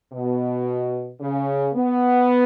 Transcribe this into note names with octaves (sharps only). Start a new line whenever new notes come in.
B2
C#3
B3